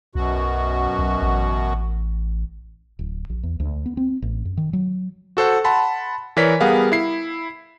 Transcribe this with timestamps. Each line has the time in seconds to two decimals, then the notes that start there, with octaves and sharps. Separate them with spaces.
0.15 B1 F#2 B2 F#4
0.99 B1
1.22 A1
2.99 D1
3.30 A#1
3.43 E2
3.60 D2
3.86 B3
3.97 C4
4.22 A1
4.45 F#2
4.57 D#3
4.73 F#3
5.37 F#4 A4 C5 F#5
5.64 F#5 A5 B5 C6
6.37 E3 A#4 C#5 D5 B6
6.60 G3 B3 G#4 A#4 F5 F#5
6.92 E4 C7